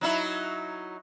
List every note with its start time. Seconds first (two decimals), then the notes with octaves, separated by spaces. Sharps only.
0.01 F#3 D#4 E4